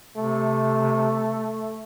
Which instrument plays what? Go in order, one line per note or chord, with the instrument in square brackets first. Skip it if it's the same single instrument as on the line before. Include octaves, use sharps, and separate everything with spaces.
[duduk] C3 [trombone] A3